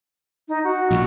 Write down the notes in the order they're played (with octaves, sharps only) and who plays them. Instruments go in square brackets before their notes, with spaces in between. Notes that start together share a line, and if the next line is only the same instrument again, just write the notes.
[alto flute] D#4
F#4
[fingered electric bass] A#1